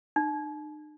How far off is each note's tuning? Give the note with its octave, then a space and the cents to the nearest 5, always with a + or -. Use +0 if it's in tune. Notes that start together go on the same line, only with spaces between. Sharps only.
D#4 -45